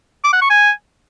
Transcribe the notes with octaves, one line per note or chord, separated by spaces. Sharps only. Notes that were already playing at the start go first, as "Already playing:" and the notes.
D6
F#5
C#6
G#5